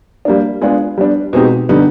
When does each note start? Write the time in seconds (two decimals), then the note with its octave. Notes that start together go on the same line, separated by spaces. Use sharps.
0.25 G3 A#3 D4
0.62 G#3 B3 D4 F4 G#4
0.98 G3 B3 D4
1.33 B2 G#3 C4 D#4 G4
1.69 D3 G3 B3 D#4